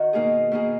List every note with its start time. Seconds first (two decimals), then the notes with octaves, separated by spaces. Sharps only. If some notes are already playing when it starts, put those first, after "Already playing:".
Already playing: D#3 F#4
0.13 B2 A#3 D#4 G#4
0.52 B2 A#3 D#4 G#4